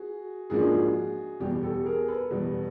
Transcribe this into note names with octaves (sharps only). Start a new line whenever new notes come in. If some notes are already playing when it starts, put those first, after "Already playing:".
Already playing: F#4 G#4
G#2 F3 A#3 D4 F#4 G#4
E2 B2 G3 G4
G4 A4
G#4 A#4
A4 B4
E2 B2 G3